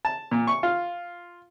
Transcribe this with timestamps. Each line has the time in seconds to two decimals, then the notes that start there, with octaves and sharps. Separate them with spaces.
0.05 A5
0.31 A#2
0.47 C#6
0.63 F4